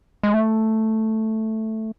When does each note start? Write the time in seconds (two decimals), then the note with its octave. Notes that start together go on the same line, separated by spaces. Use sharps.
0.23 G#3
0.34 A3